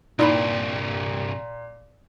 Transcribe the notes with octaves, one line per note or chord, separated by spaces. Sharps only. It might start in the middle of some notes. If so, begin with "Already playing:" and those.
C2 G2 A#2 D#4 E4 B5